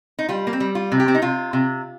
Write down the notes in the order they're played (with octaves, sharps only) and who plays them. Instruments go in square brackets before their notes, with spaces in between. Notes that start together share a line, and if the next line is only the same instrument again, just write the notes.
[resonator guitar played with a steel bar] D#4
G3 F4
A#3
C4
G3
F4
C3
G4
C4
D#4
C3 F4
C3